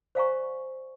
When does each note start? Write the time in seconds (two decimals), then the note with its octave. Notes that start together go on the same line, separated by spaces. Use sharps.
0.15 C5 D5 F5 G#5 A#5 C#6